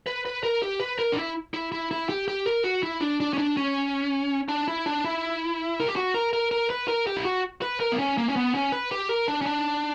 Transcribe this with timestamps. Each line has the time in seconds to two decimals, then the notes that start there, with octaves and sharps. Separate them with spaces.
0.06 B4
0.25 B4
0.43 A#4
0.62 G4
0.80 B4
0.99 A#4
1.12 D4
1.16 E4
1.54 E4
1.72 E4
1.91 E4
2.09 G4
2.28 G4
2.46 A#4
2.64 F#4
2.83 E4
3.01 D4
3.20 D4
3.33 C#4
3.38 D4
3.57 C#4
4.48 D4
4.68 E4
4.86 D4
5.05 E4
5.80 A#4
5.88 G4
5.96 F#4
6.14 A#4
6.33 A#4
6.51 A#4
6.70 B4
6.88 A#4
7.07 G4
7.16 E4
7.25 F#4
7.62 B4
7.80 A#4
7.92 B3
7.99 C#4
8.18 A#3
8.29 C#4
8.36 B3
8.55 C#4
8.72 B4
8.91 G4
9.09 A#4
9.28 D4
9.41 C#4
9.46 D4